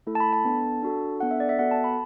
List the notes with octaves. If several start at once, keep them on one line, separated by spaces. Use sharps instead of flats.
A3 E4 A4
A5
B5
A5
B3 D4 A4
D4 F#4 A4
B3 D4 A4 F#5
E5
D5
E5
B3 F#4 A4 F#5
A5
B5